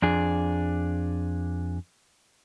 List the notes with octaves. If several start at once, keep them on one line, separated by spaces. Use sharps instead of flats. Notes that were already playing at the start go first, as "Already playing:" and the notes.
F2 D4 G#4